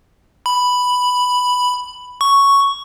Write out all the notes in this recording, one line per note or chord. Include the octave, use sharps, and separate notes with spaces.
B5
C#6